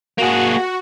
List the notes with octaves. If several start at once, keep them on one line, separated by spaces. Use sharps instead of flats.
A#3 F#4 G#4